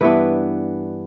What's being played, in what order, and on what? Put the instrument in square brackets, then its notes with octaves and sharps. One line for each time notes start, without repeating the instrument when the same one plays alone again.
[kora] G2 E3 B3 D4 B4